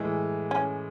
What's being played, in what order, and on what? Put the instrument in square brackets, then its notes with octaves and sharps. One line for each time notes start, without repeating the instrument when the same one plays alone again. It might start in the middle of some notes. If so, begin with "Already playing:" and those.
Already playing: [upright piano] A2 E3 G#3
[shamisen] C#4